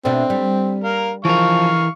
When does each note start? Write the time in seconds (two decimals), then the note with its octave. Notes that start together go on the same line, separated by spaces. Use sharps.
0.05 B2 A3 C4 D4
0.30 G3
0.84 A#4 F5
1.25 E3 F3 A#4 F5 C#6